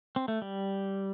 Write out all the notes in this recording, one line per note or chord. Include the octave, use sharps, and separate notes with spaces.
C4
A3
G3